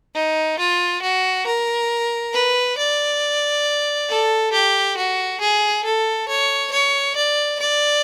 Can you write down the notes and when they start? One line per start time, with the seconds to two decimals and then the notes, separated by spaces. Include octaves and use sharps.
0.15 D#4
0.59 F4
1.02 F#4
1.46 A#4
2.33 B4
2.77 D5
4.09 A4
4.53 G4
4.97 F#4
5.40 G#4
5.84 A4
6.28 C#5
6.72 C#5
7.16 D5
7.60 D5